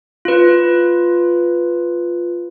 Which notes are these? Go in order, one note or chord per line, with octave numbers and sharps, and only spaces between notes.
F4 B4